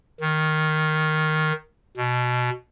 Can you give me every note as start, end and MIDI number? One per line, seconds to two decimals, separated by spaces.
0.21 1.52 51
1.97 2.50 47